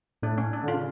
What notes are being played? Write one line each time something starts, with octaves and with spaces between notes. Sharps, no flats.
A2 D4
C#4
D4
D3
F4
C#3